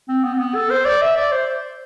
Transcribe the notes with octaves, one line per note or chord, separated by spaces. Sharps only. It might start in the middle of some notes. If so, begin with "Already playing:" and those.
C4
B3
C4
B3
A4
C5
D5
E5
D5
C5